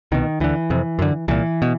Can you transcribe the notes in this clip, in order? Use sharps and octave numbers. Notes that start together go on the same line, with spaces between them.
C2 B2 D#3
D2 D3 E3
F2 C3
F#2 D3
C2 A#2 E3
B2